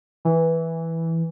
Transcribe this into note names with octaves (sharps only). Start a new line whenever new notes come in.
E3